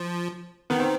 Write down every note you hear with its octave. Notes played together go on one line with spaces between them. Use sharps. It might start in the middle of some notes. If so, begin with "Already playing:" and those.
Already playing: F3
D#3 B3
C4